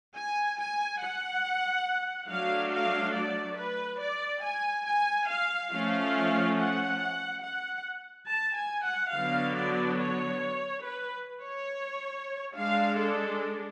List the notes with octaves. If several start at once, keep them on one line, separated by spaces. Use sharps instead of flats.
G#5
G#5
F#5
F#3 A3 D4 F5
F5
D5
B4
D5
G#5
G#5
F5
F3 A3 C#4 F5
F#5
F#5
A5
G#5
F#5
D3 F#3 B3 D4 F5
D5
C#5
B4
C#5
G#3 D4 F5
A4